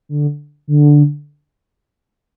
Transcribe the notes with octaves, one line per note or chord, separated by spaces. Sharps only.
D3
D3